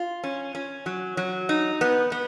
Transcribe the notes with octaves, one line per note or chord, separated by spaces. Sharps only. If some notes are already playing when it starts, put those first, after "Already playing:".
Already playing: F4
C#4
C#4
F#3
F#3
D#4
B3
B3